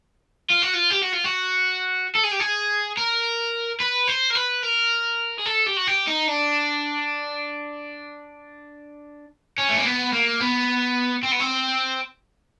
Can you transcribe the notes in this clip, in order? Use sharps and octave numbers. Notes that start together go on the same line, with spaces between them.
F4
F#4
F4
G4
F#4
F4
F#4
A4
G#4
G4
G#4
A#4
B4
C5
A#4
B4
A#4
G#4
A4
G4
F#4
G4
D#4
D4
C#4
A3
A#3
B3
A#3
B3
C4
B3
C4